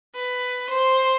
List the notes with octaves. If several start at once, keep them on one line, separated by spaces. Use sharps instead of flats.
B4
C5